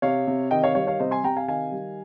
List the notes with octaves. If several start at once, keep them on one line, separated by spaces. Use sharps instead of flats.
C3 C#5 F5
C3
D#3 D#5 G5
C#5 F5
G3 C#5 F5
C#5 F5
C3 C5 D#5
G#5 C6
C3 G5 A#5
F5 G#5
D#3 F5 G#5
G3